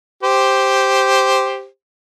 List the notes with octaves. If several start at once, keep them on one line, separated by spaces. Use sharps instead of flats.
G4 C5